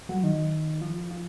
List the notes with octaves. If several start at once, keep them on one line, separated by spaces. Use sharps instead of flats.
F#3
D#3
F3
F3